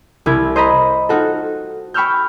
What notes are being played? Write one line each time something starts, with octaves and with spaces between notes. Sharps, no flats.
C2 E4 G#6
C5 D#5 A#5 B5
D#4 F4 F#4 A4
G5 B5 C#6 E6 F6 G6